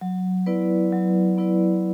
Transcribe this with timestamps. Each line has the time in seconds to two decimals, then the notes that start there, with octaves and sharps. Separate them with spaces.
0.01 F#3
0.46 B3 E4 B4 D5
0.92 F#3
1.38 B3 E4 B4 D5